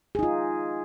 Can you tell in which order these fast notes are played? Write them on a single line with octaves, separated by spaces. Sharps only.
G#4 D#4 F4